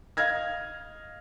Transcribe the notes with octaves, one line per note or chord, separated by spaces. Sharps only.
D#5 F5 F6 G#6 A#6